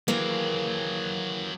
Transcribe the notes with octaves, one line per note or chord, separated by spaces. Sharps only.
D#2 E3 F#3 A#3 G#4